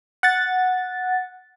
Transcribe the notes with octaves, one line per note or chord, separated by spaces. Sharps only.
F#5 A6